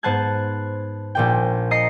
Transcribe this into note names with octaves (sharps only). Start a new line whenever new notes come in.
G#2 B3 C5 A5 F#6 G#6
A#1 A#2 G5
D#5 A#5 D#6 A#6 C7 C#7